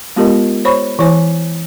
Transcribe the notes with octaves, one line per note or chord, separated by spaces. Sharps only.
G#3 B3 F4 G4 A#4 D#5
C5 C#5 B5 C#6
E3 E4 C5 C#5 G#5